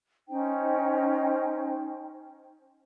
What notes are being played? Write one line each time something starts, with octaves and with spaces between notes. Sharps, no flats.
C#4 D#4 C5 G5